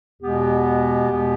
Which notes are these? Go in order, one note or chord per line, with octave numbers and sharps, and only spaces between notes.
E2 B2 G#3 B3 G4
E2 B2 G#3 B3